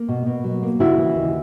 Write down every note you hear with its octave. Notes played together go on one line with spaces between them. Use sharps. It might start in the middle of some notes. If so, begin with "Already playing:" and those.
Already playing: A#3
B2
B2
F#3
A#3
C#3 E4 F#4
E3
D#2